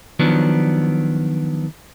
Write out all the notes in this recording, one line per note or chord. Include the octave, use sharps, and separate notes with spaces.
D#3 F3 F#3 B3 D4